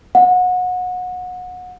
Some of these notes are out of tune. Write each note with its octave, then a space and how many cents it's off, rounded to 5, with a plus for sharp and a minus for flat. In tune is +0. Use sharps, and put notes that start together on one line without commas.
F#5 -25